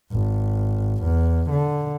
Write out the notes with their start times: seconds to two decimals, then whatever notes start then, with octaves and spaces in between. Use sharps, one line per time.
0.12 G#1
1.04 E2
1.50 D3